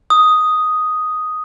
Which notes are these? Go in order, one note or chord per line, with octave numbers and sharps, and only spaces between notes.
D#6